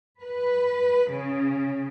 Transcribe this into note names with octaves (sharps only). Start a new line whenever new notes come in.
B4
C#3